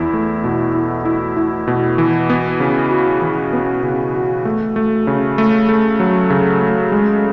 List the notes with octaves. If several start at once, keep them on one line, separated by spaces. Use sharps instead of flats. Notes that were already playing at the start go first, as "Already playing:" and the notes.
Already playing: E2 E4
A3
B2
E4
E4
E4
B2
E3
B3
C#3
F#4
E3
B3
C#3
F#4
A3
A3
C#3
A3
A3
F#3
C#3
A3
G#3